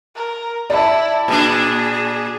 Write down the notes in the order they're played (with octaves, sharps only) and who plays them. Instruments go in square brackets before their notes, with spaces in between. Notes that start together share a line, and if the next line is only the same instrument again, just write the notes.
[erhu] A#4
[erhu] E4 [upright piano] D5 A5
[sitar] A#2 D4 [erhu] G#4